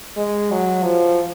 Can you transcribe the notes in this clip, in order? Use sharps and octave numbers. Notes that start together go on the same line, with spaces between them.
G#3
F#3
F3